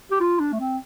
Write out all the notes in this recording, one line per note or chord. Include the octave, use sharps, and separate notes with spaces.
G4
F4
D4
A3
C4